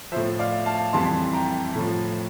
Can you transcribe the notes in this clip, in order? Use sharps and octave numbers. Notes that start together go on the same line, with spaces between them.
A2 F3 C5 E5
D5 F5
F5 A5
F2 E3 G3 A5 C6
G5 A#5
A2 F3